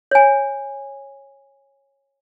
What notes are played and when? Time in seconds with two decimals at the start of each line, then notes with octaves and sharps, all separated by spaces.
0.11 C#5 G#5